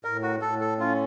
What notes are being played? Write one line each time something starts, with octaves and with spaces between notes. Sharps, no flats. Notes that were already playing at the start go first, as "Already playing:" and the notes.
A2 A#4
F#4
A2 A4
A4
C#4 F4